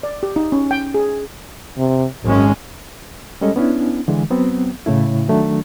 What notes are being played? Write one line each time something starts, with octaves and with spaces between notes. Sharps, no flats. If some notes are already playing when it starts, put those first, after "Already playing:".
D5
G4
D#4
C#4
G5
G#4
C3
G#1 F#2 G#3 C#4
G3 G#3 C#4 A4 D#5
B3 C#4 D4 E4
D3 E3 G#3
F#3 B3 C4
A2 C#3 A3 E4
D#3 F#3 A3 D4